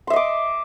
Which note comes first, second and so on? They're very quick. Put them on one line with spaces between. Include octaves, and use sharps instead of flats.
C6 E5 D#5 D6